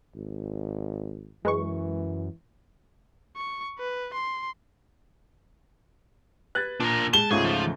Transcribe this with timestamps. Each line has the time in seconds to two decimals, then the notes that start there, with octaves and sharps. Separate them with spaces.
0.15 G#1
1.45 F#2 E3 G#3 B4 C#6
3.36 C#6
3.78 B4
4.13 C6
6.55 B4 F#6 G#6 A6
6.80 A#2 D4 A#4
7.14 G#3 A5 G7
7.31 C#2 G#2 C#3 A3 F4 G#4 C#6
7.44 F3